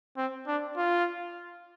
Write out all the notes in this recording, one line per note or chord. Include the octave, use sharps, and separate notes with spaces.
C4
D4
F4